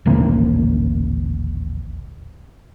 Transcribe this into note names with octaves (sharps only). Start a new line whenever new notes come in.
D#1 A1 D3 A#3